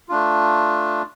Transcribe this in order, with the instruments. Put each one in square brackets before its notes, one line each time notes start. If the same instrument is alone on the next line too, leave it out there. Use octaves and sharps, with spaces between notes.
[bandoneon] A3 D4 F4